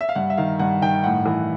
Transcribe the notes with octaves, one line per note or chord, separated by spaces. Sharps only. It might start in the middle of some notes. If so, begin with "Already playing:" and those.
E5
F5
G2 F#5
E5
D#3 F5
G2 F#5
D#3 G5
A2 F#5
E3